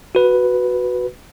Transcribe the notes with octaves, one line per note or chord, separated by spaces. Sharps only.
F#4 B4